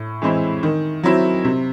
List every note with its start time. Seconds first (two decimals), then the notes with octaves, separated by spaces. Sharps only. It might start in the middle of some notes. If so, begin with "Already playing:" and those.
Already playing: A2
0.22 E3 G#3 C4 E4
0.63 D#3
1.04 F#3 C4 E4
1.44 C3